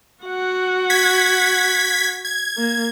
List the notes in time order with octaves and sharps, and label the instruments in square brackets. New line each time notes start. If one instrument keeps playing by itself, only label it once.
[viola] F#4 F#5
[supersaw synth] G#6 B6
G#6
[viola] A#3